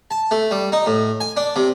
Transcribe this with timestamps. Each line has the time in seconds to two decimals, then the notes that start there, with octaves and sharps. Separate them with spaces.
0.11 A5
0.31 A3
0.51 G3
0.72 D#4
0.86 A2
1.20 G#5
1.37 D4
1.56 C3